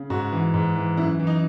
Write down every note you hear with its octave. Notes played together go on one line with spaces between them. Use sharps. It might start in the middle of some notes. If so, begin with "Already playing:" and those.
Already playing: C#3
G#2 F#4
E3
G#2
E3
F#2 E4
E3
D#4